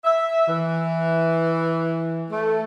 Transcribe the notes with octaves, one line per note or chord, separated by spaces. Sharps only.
E5
E3
A3